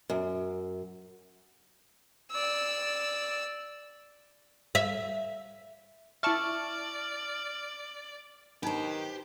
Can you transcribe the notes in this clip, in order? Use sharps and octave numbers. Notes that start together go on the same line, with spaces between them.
F#2
D5 E6
E5
E4 D5 E5 A5 C#6 F6 A6
D#3 D4 D#4 G4 B4 C5 A#5